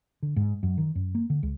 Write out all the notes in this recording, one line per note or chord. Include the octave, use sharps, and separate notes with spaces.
D3
G#2
F#2
D#3
F#2
A#3
D3
C#2